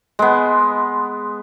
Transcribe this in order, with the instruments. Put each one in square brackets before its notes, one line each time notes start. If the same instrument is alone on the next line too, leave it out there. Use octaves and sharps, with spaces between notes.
[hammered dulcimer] G#3 B3